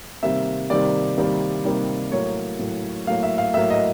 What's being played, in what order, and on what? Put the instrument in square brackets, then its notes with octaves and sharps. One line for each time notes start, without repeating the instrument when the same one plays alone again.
[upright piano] C3 D#3 G3 A#3 E5
C3 D#3 G3 A#3 D5
C3 D#3 G3 A#3
C3 D#3 G3 A#3
A2 F#3 A#3 C#5
A2 F#3 A#3
A2 F#3 A#3 F5
E5
F5
A2 F#3 A#3 E5
D#5